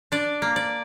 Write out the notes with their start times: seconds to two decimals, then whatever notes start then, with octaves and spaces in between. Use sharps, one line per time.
0.12 D4 D5
0.42 A#3
0.56 D5